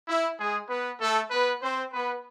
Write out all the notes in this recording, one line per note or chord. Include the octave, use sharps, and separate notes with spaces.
E4
G#3 G#4
B3 B4
A3 A4
B3 B4
C4 C5
B3 B4